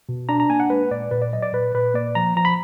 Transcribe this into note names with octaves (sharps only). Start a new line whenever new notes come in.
B2
D4 A#5
A#5
A#3 G#5
F#5
G#3 B4
A#2 D5
A#2 B4
D5
F#3 D#5
D5
A#2 B4
A#2 B4
A#3 D5
F3 A#5
F3 A#5
B5